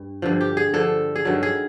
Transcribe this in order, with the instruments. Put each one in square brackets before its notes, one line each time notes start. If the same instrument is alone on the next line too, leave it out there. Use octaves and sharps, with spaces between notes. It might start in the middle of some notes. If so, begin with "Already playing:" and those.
Already playing: [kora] G2
G2 D3 F3
G4
G#4
G2 D3 F3 A4
G#4
G2 D#3 F#3 A4
G#4